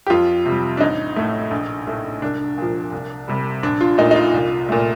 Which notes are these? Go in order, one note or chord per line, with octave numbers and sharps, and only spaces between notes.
G4
F2 F4
C3 G3
D4
A1 D#4
A2 A3
A#1
A2 A3
C2 D4
A#2 F3
C2
C3 G3
A#1 D4
F4
A#2 A3 D#4
D#4
F4
C2
A#2 A3